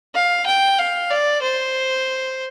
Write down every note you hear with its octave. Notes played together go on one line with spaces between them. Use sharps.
F5
G5
F5
D5
C5